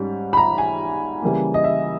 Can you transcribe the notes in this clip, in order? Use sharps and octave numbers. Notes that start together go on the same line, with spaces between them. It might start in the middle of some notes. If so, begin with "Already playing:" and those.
Already playing: G#2 G3 C#4
B5
A#5
G#5
C#3 E3 G3 A#3
D#5
E5